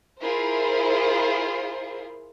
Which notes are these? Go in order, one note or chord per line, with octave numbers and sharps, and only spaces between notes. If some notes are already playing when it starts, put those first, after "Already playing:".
E4 F4 G#4 A#4 C5